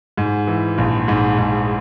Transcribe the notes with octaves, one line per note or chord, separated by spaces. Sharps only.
G#2
E3
A#1
G#2
G#2